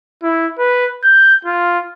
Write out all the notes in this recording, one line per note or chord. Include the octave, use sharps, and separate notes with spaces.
E4
B4
G6
F4